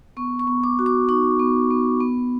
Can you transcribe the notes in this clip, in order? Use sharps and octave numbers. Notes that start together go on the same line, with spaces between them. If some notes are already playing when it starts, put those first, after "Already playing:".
B3 C#6
C#6
B3
D6
F#4
D6
D#4 C#6
B3
B3
B3